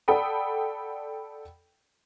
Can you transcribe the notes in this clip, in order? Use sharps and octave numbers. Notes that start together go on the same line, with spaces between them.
A4 D5 F#5 G5 B5 D#6